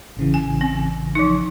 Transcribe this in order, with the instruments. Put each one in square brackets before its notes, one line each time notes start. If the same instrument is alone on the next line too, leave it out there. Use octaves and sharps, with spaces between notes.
[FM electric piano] A1 C#3 E3
[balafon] G#5
C4
F3 D#4